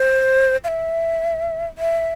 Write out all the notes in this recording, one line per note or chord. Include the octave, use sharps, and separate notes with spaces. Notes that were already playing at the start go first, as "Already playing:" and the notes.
Already playing: C5
F5
E5
E5